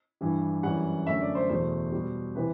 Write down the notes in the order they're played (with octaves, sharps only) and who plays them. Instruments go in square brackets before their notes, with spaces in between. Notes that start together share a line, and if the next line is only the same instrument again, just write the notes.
[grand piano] G2 E3 G3
F#2 E3 G3 F#5
F#2 D3 A3 E5
D5
C5
E2 B2 A3 C5
B2 G3
C3 E3 B4